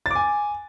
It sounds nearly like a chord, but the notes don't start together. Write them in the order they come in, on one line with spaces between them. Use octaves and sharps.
A6 D6 G#5